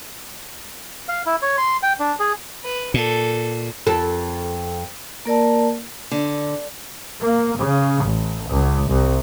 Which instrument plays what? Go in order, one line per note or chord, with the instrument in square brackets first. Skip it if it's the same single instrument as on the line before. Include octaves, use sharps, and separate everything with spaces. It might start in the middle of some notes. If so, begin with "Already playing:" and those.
[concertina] F5
E4
C#5
C6
G5
D4
G#4
[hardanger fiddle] B4
[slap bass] A#2 [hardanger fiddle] A4
[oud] F2 A4
[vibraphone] A#3 A#4 D5 A5
[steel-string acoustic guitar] D3
[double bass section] A#3
C#3
A1
C#2
C2